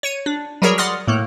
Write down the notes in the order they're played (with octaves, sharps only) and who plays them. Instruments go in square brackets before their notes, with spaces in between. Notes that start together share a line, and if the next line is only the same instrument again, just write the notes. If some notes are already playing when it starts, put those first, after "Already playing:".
[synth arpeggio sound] C#5 C#7 D#7
D4
F#3 G3 F#4 G#4 A#4 C#5
D5 F#5 C6 D#6 F6 A#6
A2 A3 A#3